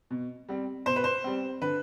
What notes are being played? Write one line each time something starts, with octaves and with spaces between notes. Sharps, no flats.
B2
G3 C4
B2 C5
B4
C5
G3 C4
D3 B4